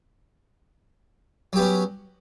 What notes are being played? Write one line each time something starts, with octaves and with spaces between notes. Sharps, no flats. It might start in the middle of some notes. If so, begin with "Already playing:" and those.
F#3 B3 C#4 G4